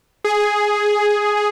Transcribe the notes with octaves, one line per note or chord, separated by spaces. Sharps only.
G#4